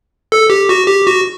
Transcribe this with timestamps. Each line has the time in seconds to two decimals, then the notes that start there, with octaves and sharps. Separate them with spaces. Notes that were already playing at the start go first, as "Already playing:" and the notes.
0.32 A4
0.50 G4
0.69 F#4
0.87 G4
1.07 F#4